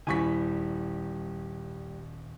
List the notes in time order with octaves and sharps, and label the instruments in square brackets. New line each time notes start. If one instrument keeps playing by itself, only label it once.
[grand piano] D#1 C#6 B6 [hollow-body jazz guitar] G3 E4 G#5